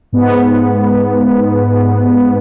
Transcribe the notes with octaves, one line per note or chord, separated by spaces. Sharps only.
G#2 B3